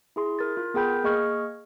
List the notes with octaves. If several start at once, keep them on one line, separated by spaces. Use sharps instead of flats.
E4 G#4 C6
A#4 A6
F4
B3 G#4 A#4 G5 B5 G6
A#3 G#4 D#5 C#6 F6 G#6